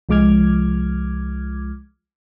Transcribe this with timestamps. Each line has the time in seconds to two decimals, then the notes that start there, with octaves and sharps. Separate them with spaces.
0.09 C2 F3 G#3 D6 F6 G#6